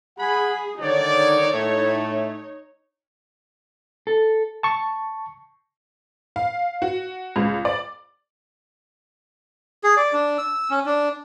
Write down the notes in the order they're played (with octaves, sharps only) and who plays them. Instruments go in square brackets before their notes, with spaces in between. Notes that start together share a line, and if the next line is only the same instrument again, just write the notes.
[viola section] G#4 [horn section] F#5 G#5 B5
[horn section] D3 D#3 D5 [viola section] D#4 C#5
[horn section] A2 A3
[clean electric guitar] A4
[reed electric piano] A5 C#6
[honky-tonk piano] F5
F#4
C#2
D5
[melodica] G#4
D5
D4
E6
C#4
D4